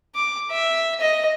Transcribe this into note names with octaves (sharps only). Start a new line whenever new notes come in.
D6
E5
D#5